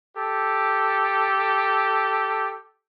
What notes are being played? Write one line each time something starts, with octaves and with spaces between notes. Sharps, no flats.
G4 A4